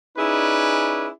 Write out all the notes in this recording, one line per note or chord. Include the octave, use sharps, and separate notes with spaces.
C#4 D#4 E4 G#4 B4 D5